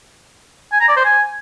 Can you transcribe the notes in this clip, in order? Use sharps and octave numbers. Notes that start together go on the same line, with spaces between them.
G#5
A#5
D5
C5
G#5